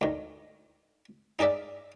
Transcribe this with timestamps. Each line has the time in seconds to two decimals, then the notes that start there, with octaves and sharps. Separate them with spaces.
0.01 D2 D#3
1.39 D#4 G#4 A#4 D5 E5